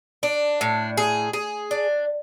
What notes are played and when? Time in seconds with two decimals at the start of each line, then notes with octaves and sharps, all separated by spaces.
0.23 D4
0.61 A2
0.97 G#4
1.33 G#4
1.71 D4